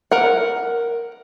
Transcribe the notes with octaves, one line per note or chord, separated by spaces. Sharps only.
A#4 F#5